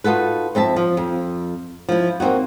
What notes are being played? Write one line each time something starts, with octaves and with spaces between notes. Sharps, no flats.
D#4 F4 F#4 A4 B4
F2 C4 E5 A5
F3
F2
F3 E4
A#3 C4 D#4 F#4